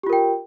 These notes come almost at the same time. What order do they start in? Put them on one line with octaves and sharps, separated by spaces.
G4 F4 A#4 G5